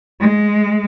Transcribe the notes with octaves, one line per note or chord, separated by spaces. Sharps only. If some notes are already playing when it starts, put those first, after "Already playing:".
G#3